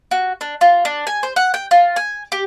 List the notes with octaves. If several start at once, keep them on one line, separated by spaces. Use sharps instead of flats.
F#4
D4
F4
D4
G#5
C5
F#5
G5
F4
G#5
G4